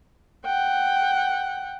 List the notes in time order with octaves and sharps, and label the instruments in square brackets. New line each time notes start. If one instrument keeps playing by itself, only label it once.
[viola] F#5 G5